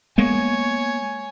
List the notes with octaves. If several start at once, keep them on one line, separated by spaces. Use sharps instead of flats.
G#3 A#3 B3 C#5 G#5